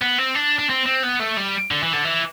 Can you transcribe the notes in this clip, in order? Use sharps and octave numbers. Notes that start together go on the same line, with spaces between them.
B3
C4
D4
D4
C4
C4
B3
A3
G3
D3
E3
D3
E3